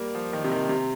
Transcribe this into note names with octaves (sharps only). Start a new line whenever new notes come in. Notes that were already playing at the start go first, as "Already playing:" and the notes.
Already playing: G3 A#3
F3
D#3
C3
D#3
C3